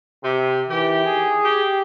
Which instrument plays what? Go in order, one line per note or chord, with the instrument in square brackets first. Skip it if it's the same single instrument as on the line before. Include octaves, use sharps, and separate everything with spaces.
[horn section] C3
[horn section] D#3 G4 [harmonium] E3
[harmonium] G#4
[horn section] G4